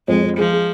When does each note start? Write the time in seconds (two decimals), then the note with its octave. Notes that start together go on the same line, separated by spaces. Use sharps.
0.08 F2 G#3
0.23 F2
0.38 F3 G#3
0.53 G#3